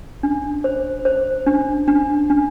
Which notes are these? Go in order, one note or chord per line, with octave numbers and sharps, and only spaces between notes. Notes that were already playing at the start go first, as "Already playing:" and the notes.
D4
C5
C5
D4
D4
D4